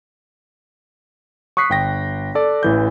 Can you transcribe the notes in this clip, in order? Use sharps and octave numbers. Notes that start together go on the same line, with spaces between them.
C#6 D#6 F#6 B6 C7
G1 G5 A#6
A4 D5
A1 E3 G6